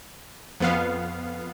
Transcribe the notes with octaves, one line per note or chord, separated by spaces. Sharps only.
F2 B3 F5